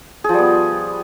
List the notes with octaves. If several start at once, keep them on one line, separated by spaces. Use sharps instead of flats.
F3 G3 B3 G#4